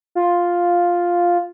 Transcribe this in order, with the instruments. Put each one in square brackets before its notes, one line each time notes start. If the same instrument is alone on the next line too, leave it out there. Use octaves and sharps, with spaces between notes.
[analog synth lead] F4